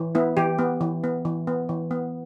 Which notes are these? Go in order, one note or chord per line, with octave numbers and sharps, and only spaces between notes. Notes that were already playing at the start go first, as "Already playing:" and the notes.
Already playing: E3
B3 E4
E3 G4
B3
E3
B3
E3
B3
E3
B3